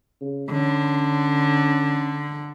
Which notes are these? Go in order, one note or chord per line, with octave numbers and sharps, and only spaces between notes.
C#3
D3 C#4